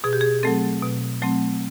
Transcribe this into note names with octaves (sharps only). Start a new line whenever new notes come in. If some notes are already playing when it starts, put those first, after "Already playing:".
B2 G#4
G4
G#4
F#3 A3 C4 A4
B2
F#3 A3 C4